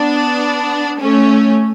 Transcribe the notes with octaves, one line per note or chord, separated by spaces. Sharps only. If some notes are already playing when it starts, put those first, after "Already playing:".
Already playing: B3 D4
A3 C#4